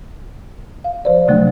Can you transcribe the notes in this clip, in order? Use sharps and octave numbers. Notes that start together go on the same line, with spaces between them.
F5
F3 C5 D5
C3 D#3 F#3 A3 D4 F#5